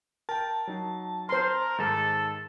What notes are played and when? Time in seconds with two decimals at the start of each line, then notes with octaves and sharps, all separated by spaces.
0.29 A#4 G5 A5
0.67 F#3 D#4
1.29 A#4 C5 C6
1.78 G#2 D#3 G#3 A4